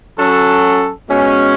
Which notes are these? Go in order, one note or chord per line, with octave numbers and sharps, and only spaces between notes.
F#3 C#4 F#4 A4
B2 G#3 C#4